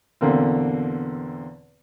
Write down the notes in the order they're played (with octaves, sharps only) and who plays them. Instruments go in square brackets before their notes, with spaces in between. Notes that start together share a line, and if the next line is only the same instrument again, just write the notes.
[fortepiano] E2 B2 D3 A#3 C4